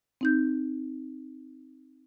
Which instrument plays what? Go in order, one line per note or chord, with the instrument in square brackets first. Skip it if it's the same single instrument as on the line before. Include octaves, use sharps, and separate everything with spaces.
[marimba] C4 D#4 G6